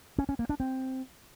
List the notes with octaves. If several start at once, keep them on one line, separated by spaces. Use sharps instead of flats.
C#4
C#4
A#3
D4
C4